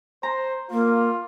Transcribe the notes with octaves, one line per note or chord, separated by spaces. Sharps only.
C5 A#5
A#3 F4